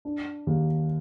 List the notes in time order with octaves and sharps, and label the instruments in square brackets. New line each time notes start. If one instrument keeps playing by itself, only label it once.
[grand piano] D4
D#2